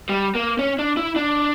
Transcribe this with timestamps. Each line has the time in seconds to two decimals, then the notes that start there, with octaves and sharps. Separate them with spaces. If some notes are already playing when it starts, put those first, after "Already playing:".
0.09 G3
0.35 A#3
0.59 C#4
0.79 D4
0.97 E4
1.16 D4